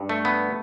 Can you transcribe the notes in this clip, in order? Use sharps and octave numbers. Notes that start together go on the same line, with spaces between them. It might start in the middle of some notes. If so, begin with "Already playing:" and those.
Already playing: G2
A3
B3